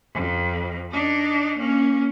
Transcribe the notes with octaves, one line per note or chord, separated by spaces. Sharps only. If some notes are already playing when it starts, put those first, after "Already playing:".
F2
D4 D#4
A#3 C#4